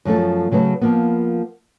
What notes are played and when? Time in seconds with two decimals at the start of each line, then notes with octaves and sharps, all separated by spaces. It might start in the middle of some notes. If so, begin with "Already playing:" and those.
0.05 F#2 F3 A3 A4
0.51 C#3 F#3 A3 B4
0.81 F3 A#3 B3